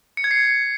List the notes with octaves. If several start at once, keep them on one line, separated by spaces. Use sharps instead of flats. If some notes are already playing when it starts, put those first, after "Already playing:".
C#7
G#6
C7